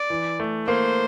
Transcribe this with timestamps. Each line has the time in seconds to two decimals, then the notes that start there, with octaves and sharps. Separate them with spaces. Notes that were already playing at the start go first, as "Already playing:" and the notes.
Already playing: D5
0.10 E3
0.40 A3
0.67 A#3 C5